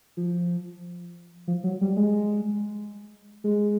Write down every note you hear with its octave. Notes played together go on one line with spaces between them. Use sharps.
F3
F3
F#3
G3
G#3
G#3